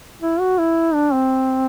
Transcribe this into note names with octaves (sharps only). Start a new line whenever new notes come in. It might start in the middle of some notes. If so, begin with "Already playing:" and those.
E4
F#4
E4
D4
C4